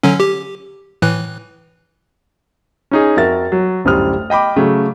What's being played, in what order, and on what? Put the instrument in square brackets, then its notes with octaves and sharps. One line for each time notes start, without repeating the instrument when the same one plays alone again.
[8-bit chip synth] D3 F#3 C#4
G4
A2 E3 F#6
[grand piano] C#4 D#4 G#4
F2 F#4 A#4 E5 A6
F#3
D1 F#2 G3 C5 D#6 F6
D#5 G5 B5 D6
C#3 F#3 A3